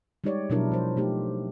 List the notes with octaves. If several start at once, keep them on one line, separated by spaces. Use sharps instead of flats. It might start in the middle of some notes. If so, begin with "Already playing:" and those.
G3 G#3 D#4 G4 C#5 D5
B2 F3 F#3 D4 E4 A#4
F3 C5
A3 D#4 G4